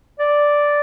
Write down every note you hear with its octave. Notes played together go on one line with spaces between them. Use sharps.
D5